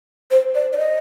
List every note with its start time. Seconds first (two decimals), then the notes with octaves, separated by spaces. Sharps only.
0.31 C5
0.55 D5
0.73 D5
0.78 D#5